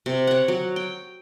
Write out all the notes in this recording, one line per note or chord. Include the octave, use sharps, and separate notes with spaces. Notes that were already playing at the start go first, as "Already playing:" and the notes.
C3
C#5 F#5
F#3
G5